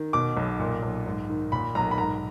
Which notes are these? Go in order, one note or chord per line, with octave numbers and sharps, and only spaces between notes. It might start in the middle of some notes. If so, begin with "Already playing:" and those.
Already playing: D#3
B2 D6
B1
A#2
B1
G#2
D#3
A#2 B5
B1 A#5
B5
G#2 A#5